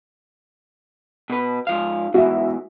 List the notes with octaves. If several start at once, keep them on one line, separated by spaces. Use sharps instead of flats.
B2 B4
G#2 F3 F5
E2 G#2 E3 F#4 E5